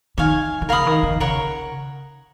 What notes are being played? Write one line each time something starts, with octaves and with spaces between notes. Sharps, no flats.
D#3 C#5 F5 G#5
D#3
C#3 A#4 F5 B5 D#6
D#3
D#3
C#3 A#4 C#5 F#5 C#6